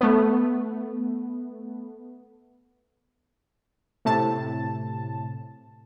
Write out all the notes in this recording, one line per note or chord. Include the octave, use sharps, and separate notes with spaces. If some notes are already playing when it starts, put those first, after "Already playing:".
A3 B3
A2 C3 A5